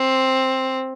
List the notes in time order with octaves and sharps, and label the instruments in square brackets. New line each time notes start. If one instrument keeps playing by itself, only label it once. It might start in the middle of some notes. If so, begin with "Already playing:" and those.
Already playing: [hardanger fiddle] C4